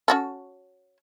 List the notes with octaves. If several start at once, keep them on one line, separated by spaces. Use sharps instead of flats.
C#4 F#4 A4